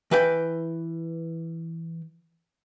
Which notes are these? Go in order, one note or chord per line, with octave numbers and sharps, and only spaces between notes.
E3 B4 G5